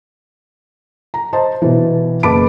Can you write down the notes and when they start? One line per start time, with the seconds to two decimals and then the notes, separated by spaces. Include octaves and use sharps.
1.14 A#5
1.33 C5 D#5 A5
1.62 B2 E3
2.23 F#1 B4 A5 B5 D6 D7